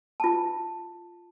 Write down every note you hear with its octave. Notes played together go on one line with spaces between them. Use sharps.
F4 A5